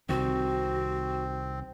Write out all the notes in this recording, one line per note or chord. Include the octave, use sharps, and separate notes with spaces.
C2 C3 D#3 C4 F#4